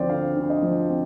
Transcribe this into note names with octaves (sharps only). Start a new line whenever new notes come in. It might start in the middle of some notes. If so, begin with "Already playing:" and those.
Already playing: D2 F3 C4 C5 D5
D3 F5
D2
D#5
F3
C4